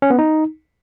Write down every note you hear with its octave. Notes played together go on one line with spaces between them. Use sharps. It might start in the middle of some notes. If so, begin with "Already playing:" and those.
C#4
B3
D#4